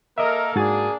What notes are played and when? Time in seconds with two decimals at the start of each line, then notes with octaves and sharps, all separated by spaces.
0.18 A#3 A4 A#4 D#5 E5
0.56 G#2 A#3 D4 F#4 G#4 A6